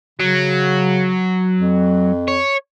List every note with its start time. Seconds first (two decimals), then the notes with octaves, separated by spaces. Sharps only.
0.20 C#3 F#3
1.57 F2
2.28 C#5